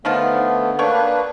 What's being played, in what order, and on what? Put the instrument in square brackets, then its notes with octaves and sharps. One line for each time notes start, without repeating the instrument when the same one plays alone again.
[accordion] D3 A3 B3 [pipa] D#3 F3 F4
[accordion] A#3 D4 B4 [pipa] C#5 G5 C#6